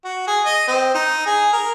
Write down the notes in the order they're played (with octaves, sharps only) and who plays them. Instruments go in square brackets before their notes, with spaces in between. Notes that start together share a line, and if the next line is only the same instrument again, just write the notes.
[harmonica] F#4
G#4
D#5
C4
D#4
G#4
A#4